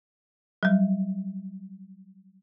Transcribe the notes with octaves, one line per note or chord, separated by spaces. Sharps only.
F#3 G3